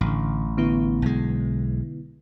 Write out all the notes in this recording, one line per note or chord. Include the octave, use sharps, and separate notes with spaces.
A1 A2 D3
D3 B3 E4
B1 G#3